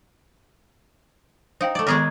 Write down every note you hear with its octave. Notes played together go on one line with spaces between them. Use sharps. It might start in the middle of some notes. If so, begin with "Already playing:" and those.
D#4 C5 F5 G5
A3 D5
D#3 G#3 B3 G#4 A#4 C#6